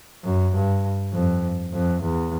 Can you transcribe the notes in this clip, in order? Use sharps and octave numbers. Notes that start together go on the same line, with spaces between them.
F#2
G2
F2
F2
E2